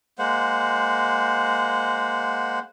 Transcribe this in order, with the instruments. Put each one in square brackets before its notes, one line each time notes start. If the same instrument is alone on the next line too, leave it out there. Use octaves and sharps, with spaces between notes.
[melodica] G#3 A#3 C5 F#5